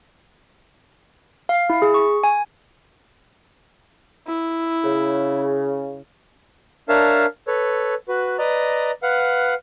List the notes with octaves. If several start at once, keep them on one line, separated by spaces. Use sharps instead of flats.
F5
E4
G#4
C#6
G#5
E4
C#3
D4 A#4 C#5 E5 F5 A5
A4 B4 C#5
F#4 B4
B4 D5 D#5 A#5
B4 F5 F#5